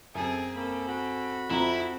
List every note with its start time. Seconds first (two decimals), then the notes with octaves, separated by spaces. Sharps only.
0.15 F#2 C4 G#4 A4
0.55 A#3 C4 A4 B5
0.88 F#4 B5
1.50 F2 C4 E4 A4 A#5